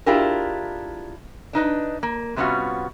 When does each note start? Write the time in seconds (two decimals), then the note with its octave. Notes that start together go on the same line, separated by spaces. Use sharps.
0.06 D4 E4 F4 G4 G#4 A#4
1.53 D4 D#4 B4 D#5
2.03 A#3
2.36 C3 G3 B3 C#4 F4 F#4